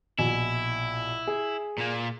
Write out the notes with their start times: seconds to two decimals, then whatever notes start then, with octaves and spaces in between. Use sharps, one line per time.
0.19 A#1 B2 E4 G#5
1.27 G#4
1.78 A#2 A#3